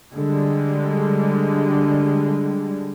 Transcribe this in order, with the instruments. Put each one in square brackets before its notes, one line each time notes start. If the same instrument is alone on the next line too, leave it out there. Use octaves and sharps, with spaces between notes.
[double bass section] D3 G3 G#3